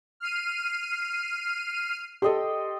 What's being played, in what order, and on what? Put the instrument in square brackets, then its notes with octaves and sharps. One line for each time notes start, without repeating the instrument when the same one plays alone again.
[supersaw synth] F6 C7 D#7
[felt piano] G4 A4 [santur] D#5 G5 C6